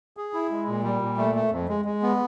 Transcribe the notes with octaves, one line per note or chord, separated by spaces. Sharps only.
G#4
E4
G#3
A#2
G3
A#2
A3
A3
F2
G#3
G#3
B3